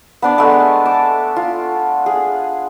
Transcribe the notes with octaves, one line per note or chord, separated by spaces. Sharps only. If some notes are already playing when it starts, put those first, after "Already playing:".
B3 D4 D5
G#3 A3 B3
A5 D6
F4
G#4